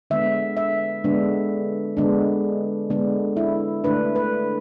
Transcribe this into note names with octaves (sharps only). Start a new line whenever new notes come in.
D3 G#3 B3 D4 E5
E5
D3 G#3 B3 D4
D3 G#3 B3 D4
D3 G#3 B3 D4
E4
D3 A3 D4 B4
B4